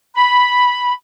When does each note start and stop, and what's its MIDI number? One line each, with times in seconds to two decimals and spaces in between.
0.16 0.93 83